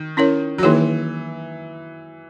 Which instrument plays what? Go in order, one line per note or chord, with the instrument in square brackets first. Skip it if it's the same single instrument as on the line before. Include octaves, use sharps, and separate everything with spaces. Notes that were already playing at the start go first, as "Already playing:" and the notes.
Already playing: [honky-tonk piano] D#3
[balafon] C#4 E4 A#4 C#5
[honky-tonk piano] F#3
[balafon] D#3 A#3 D#4 G#4 C#5 [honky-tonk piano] E3